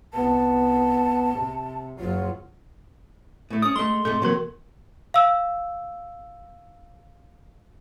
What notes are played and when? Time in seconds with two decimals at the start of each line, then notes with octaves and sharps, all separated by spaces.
0.13 C2 B3 A5
1.35 C3
1.99 F#1 F#3 F4
3.50 A2 A3
3.62 C#4 D5 D#6
3.76 G#3 A3 C6
4.05 G#2 C3 A3 A4
4.22 C3 E3 F#3 A#3 A#4
5.14 F5 E6